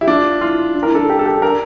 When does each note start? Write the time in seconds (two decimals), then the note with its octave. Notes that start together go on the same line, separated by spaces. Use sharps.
0.01 E4 G4
0.08 D4 F4
0.41 E4 F4
0.75 D4
0.83 E4 A#4
0.94 D4 A4
1.09 G4
1.19 A4
1.26 G4
1.42 D4 A#4